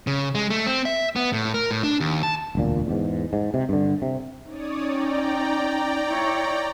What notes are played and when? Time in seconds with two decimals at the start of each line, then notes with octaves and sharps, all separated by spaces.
0.07 C#3
0.35 G#3
0.50 A3
0.66 C4
0.85 E5
1.16 B3
1.33 A2
1.54 A#4
1.71 A2
1.83 D4
2.00 D#2
2.23 A5
2.55 E1 D2 A#2
2.87 E2 G#2
3.33 G#2
3.54 C3
3.69 G2 D3
4.02 C3
4.48 C#4 D#4 C#5 D5 D#6
4.87 D5 G5 A#5
6.06 E4 C#5